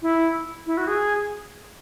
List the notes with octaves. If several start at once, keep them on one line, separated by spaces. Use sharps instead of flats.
E4
E4
F#4
G#4